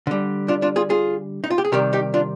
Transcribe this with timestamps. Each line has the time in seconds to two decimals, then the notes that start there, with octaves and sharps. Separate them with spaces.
0.07 D3 G3
0.48 D4 F4
0.62 D4 F4
0.76 F4 G#4
0.90 F4 G#4
1.44 D#4
1.50 F4
1.58 G4
1.65 G#4
1.72 C3 D#3 G3 G4 A#4
1.93 D#4 G4
2.14 D4 F4